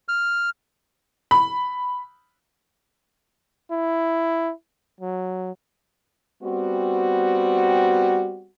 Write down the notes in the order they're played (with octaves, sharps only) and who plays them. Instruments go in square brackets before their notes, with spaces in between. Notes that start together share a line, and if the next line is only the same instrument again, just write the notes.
[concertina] F6
[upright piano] B5
[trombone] E4
F#3
[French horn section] G3 B3 C4 F#4